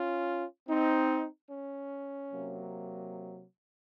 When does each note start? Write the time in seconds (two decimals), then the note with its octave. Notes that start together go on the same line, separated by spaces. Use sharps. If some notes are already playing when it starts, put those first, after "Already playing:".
Already playing: C#4 F4
0.68 C4 D#4
1.50 C#4
2.32 C3 F#3 A#3